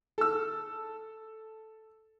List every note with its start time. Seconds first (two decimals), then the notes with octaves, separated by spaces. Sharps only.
0.18 A4 E6